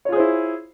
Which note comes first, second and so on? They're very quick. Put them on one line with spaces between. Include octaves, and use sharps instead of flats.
C#5 F4 G#4 C5 E4